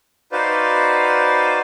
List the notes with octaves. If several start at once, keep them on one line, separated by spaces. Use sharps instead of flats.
D#4 F#4 B4 C5 D5 F5